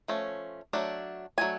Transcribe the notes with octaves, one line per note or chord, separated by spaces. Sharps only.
F3 A3 C#4
F#3 A3 D4
F#3 A3 D4 G#5